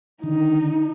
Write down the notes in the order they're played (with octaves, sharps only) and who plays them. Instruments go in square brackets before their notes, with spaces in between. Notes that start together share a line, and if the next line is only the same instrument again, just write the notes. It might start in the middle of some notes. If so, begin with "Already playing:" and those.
[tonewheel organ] D3 D#3 [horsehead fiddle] D#4